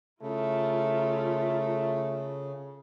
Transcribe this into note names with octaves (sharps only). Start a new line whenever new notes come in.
C#3 A3 E4 F4 A#4